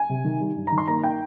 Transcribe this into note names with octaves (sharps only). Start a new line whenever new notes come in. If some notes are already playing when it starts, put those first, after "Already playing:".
Already playing: G#5
C3
D#3
G3
G2
A#5
D#3
C6
A#3 A#5
D#4 G5